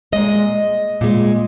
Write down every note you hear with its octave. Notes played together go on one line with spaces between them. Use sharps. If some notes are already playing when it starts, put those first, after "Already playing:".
A#2 G#3 D#5
A#2 G#3